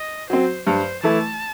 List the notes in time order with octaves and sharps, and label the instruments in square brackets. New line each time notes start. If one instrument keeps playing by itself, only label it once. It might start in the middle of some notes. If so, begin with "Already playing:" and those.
Already playing: [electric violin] D#5
[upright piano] F#3 C4 [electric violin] C5
[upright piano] G2 [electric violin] C5
[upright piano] E3 A3 E4 [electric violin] A5